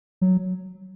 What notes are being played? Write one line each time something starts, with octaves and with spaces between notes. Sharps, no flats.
F#3